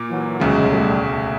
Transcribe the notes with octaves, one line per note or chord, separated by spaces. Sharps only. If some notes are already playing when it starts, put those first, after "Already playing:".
Already playing: A#2 A#3
E3 F#3
E1 D2 C#3 F#3 G#3
G3 A3